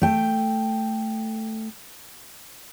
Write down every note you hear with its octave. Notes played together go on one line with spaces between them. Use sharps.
A3 G5